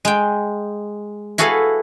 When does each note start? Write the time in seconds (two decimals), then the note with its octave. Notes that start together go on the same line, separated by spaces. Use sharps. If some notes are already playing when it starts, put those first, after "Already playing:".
0.05 G#3 G5
1.38 E4 F#4 G#4 A4 B4 F5